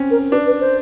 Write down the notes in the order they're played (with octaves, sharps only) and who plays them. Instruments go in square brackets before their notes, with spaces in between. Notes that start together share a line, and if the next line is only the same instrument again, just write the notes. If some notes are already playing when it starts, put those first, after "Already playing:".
Already playing: [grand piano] C4 C#4
[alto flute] A#4
[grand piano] D4 [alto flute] B4
[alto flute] B4
C5